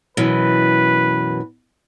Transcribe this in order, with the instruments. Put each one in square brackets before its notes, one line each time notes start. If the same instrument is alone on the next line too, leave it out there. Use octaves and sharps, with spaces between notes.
[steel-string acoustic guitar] F#2 B2 E3 [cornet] B4